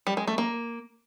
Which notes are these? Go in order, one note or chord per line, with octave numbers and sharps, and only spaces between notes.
G3
G#3
A3
A#3